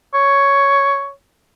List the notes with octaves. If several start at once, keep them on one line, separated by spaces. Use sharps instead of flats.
C#5